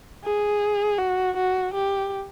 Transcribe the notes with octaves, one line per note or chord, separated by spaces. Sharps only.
G#4
F#4
F#4
G4